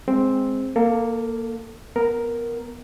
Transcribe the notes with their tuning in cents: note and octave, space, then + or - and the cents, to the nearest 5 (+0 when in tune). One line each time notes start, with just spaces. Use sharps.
G#3 +0 C4 +0 G#4 +0
A#3 +0 A4 +30
B3 +0 A#4 +0